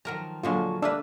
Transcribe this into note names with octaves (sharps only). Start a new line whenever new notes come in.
D#3 F3 F#3 A#4 A#5
A#2 D3 F3 F#3 G#3 A#3 F4 C#6
G3 A3 A#3 D4 B4 E6